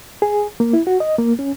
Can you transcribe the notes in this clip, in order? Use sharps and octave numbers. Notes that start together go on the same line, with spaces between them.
G#4
A#3
E4
F#4
D#5
A#3
C#4